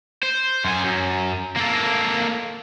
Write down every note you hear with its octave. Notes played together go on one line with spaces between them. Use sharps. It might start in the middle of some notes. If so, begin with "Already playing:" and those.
C5
F#2 G#5
F#2
A#3 A4